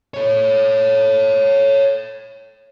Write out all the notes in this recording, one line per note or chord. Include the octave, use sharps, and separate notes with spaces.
A4 C#5